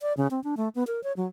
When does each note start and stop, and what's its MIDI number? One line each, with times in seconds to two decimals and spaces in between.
0.01 0.13 74
0.17 0.27 49
0.31 0.43 60
0.44 0.55 62
0.57 0.69 57
0.75 0.84 59
0.87 1.03 70
1.03 1.13 73
1.17 1.27 54